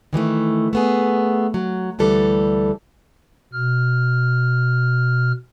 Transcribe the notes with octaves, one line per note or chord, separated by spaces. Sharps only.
D#3 E3 G3 A3
A3 B3 G#4
F#3
D2 E3 G3 A4
B2 F6